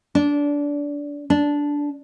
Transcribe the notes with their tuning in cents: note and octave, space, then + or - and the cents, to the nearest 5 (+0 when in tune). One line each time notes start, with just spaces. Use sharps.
D4 -20
D4 -10